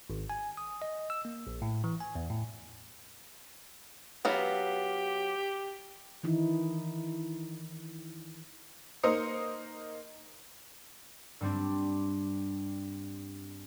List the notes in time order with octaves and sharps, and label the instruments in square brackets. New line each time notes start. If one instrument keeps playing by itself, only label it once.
[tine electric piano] G#1
G#5
D#6
D#5
E6
A#3
A#1
A2
E3
G#5
E2
A2
[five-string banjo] F#3 B3 F4 [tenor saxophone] G4
[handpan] D#3 E3 D#4 E4
[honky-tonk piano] A#3 D#4 A#4 C5 D#6 C#7
[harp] G2 G3 C4 D4